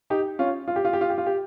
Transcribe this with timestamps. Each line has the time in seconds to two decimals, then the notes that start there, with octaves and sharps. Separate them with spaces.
0.10 D#4 G4
0.39 C#4 F4
0.68 F4
0.76 G4
0.85 F4
0.93 G4
1.01 F4
1.10 G4
1.18 F4
1.26 G4